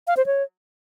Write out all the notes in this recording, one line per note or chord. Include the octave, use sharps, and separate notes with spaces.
F5
C5
C#5